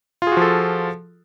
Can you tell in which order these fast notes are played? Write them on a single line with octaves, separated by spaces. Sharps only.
F4 G#4 F#4 F3 A4